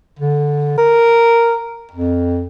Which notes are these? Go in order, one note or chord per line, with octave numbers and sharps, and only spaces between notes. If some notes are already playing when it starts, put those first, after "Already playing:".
D3
A#4
F2